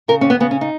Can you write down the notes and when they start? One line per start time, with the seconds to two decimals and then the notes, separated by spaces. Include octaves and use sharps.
0.08 C#3 A#4
0.21 D#2 C#4
0.30 B3
0.40 C#3 B3
0.51 C#4
0.61 D#4